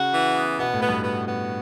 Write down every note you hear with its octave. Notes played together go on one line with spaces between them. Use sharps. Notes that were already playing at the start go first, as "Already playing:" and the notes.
Already playing: C#3 F#4
E3
B3
B2 B3
A2
B3
G2
B3
B3